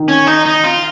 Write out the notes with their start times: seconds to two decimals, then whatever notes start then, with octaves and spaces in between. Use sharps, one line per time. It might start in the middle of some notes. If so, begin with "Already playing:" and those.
Already playing: D#3
0.08 C#4
0.27 D#4
0.46 D#4
0.64 F4